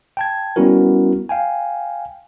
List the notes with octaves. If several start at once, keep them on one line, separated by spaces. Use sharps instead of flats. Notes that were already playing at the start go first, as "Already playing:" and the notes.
G5 A5 G#6
G3 B3 C#4 E4 F#4 A#4
F5 G5 G#5